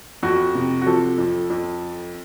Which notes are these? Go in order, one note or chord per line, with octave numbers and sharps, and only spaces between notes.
F2 F#4
C3
F#4
F3 A4
F2
F2